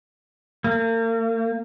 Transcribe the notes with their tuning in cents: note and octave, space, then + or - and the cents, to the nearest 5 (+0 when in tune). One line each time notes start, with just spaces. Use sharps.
A#3 -40